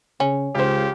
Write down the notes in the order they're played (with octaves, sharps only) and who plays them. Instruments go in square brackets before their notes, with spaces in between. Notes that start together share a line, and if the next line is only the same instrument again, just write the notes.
[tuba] C#3 [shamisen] C#4
[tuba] C#2 [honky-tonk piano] C#3 C5 [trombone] G4